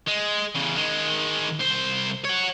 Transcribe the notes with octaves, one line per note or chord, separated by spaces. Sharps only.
G#3
E2 C#3
D#3 G#3
C2 C5
C#5 F#5